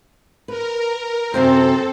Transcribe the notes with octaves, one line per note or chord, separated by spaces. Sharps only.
A#4 B4
F#2 C3 C4 A4 C5